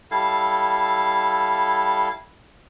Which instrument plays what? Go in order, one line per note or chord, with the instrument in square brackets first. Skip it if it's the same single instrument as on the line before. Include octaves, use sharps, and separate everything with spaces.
[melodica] G3 E4 A4 F5